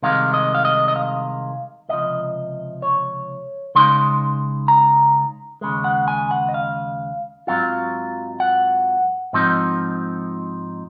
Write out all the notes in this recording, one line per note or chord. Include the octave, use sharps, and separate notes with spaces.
C2 C3 D#3 G#3 F5
D#5
F5
D#5
D#5
F5
C#2 C3 F3 D#5
C#5
C#3 G#3 D#4 C6
A#5
D#2 C#3 G#3
F#5
G#5
F#5
D#5
F5
G#2 F#3 C4 F4 F5
F#5
G#2 F3 C4 D#4